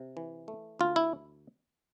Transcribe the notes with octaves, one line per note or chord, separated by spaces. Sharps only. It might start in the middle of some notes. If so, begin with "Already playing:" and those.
Already playing: C3
E3
A3
D2 F4
E4